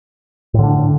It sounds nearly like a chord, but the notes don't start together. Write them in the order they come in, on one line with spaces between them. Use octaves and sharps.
A2 D3 D4